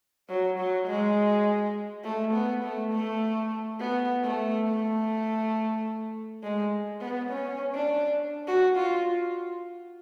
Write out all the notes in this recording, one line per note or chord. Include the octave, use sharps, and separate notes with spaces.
F#3
F#3
G#3
A3
B3
A3
A3
B3
A3
A3
G#3
B3
C#4
D4
F#4
F4